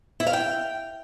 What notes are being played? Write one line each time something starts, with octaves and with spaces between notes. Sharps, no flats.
E4
F5
G5